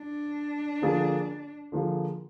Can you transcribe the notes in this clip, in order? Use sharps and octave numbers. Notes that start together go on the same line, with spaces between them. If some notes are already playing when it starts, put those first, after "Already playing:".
Already playing: D4
D3 F3 A#3 F4 G#4
D3 F3 A#3 F4 G#4